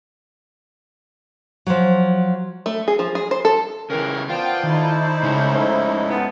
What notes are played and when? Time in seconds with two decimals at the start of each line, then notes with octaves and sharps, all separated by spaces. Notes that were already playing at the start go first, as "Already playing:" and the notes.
1.67 F3 F#3
2.66 A3
2.88 G#4
2.99 F3
3.15 G#4
3.31 C5
3.45 A4
3.90 C#3 E3 G#3 G4 A#4
4.29 B3 D4 F4 C5 G5
4.63 D#3 A3 D#4 E4
5.23 G#2 C#3 C#4
5.55 D2 A4 C5 D#5 E5
6.10 F3 G3 B3